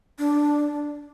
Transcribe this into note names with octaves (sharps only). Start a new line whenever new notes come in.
D4